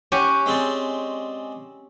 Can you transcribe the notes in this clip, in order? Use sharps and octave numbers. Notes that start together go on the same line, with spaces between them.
C#4 G4 F#5
G#3 C4 D5